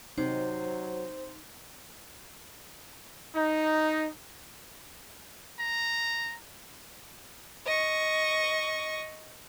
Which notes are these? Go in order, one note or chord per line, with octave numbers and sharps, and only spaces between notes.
C3 F#3 D#4 C5
D#4
A#5
D#5 C#6